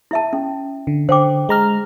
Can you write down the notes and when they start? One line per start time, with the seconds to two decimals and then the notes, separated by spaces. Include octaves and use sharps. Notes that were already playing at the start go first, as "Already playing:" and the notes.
0.11 E4 E5 A5
0.33 C#4
0.87 D3
1.09 D3 C5 G5 D6
1.49 G#3 A#5 F6